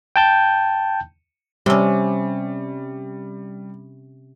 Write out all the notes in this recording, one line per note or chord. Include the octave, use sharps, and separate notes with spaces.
G5 A5 G6
C3 G3 C#4